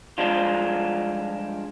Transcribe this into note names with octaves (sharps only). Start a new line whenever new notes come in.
G2 F3 G#3 D4 F4